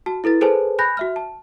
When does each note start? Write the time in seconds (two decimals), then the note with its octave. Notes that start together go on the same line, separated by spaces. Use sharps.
0.06 F#4 A5
0.24 E4 A4 B4 A6
0.41 G#4 A4 B4 C5 G#5 A5
0.79 G#5 B5 F#6 G6 A#6
0.97 F#4 E5 F6
1.16 A5